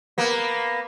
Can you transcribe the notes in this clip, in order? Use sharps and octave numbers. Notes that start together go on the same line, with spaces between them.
A#3 B3